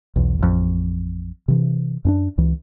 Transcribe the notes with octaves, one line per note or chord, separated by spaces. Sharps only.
B1 E2
A1 F2
C3 E3
F#2 C#4 D4
C#2 E3